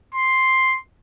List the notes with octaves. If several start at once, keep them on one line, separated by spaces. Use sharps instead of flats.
C6